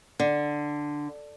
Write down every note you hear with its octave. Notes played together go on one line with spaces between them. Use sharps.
D3